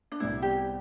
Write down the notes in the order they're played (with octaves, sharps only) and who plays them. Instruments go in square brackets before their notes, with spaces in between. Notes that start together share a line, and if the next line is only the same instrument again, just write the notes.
[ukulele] D4
[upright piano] C2 C3 G3 B3 [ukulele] E4
[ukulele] G4